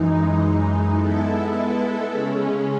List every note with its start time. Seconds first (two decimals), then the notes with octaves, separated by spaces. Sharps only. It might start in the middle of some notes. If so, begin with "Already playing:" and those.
Already playing: F#2 E3 G#3 D#4
0.96 G#3 B3 E4 A4
2.13 C#3 G#3 C#4